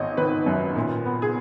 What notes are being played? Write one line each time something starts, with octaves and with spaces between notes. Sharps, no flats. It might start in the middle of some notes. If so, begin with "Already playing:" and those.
Already playing: G#1 D#3 C#5 D#5
D#3 B4
F#2
A#2
B3
G#4